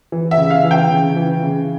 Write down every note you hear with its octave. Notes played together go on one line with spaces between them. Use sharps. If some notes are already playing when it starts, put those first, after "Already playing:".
E3
E5
C#3
F5
E3
G5
C#3
E3
C#3